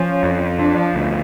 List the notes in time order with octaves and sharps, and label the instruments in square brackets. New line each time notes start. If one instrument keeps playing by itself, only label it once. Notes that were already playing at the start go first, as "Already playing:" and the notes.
Already playing: [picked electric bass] F3 [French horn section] C#4
[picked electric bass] F2
[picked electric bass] F3 [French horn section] D4
[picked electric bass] D2